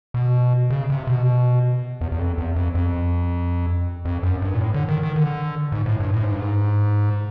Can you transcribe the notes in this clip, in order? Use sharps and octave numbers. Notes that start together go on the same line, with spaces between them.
B2
C#3
C3
B2
E2
E2
F2
E2
F2
F2
F2
F#2
G2
A#2
A2
D3
D#3
D#3
D3
G#2
A2
G2
A2
G#2
G2
G#2